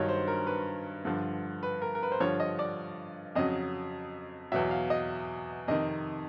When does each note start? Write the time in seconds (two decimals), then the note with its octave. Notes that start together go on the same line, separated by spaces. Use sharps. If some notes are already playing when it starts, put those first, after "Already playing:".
Already playing: G2 D#3 F#3 C#5
0.09 C5
0.28 A#4
0.47 B4
1.05 G2 D3 F3
1.63 B4
1.82 A#4
1.95 A#4
2.03 B4
2.12 C5
2.20 G2 D3 F3 C#5
2.40 D#5
2.59 D5
3.35 F2 C#3 F#3 D#5
4.52 E2 B2 F#3 E5
4.71 F5
4.90 D#5
5.68 F2 C3 D#3 D#5